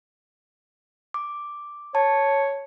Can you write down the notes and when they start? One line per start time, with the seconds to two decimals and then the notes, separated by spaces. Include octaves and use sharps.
1.14 D6
1.95 C#5 A5